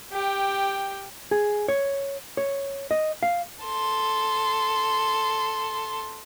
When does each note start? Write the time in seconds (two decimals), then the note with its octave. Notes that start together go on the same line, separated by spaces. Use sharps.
0.12 G4 G5
1.31 G#4
1.68 C#5
2.37 C#5
2.91 D#5
3.23 F5
3.64 A4 C6